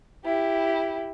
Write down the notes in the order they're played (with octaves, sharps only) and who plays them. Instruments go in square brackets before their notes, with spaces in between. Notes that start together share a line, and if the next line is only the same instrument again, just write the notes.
[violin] E4 G4